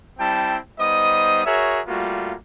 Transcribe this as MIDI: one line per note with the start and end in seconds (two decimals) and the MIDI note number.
0.19 0.57 55
0.19 0.57 60
0.19 0.57 64
0.19 0.57 79
0.19 0.57 81
0.79 1.43 55
0.79 1.43 59
0.79 1.43 63
0.79 1.43 72
0.79 1.43 75
0.79 1.43 87
1.44 1.79 66
1.44 1.79 68
1.44 1.79 70
1.44 1.79 73
1.44 1.79 76
1.87 2.34 55
1.87 2.34 57
1.87 2.34 58
1.87 2.34 65
1.87 2.34 66